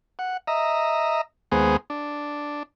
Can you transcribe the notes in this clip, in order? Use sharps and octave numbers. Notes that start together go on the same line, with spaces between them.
F#5
D#5 E5 A#5
D#2 G#3 B3 G#4 C5
D4